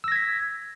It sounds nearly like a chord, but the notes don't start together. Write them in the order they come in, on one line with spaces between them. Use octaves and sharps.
E6 A#6 G#6 B6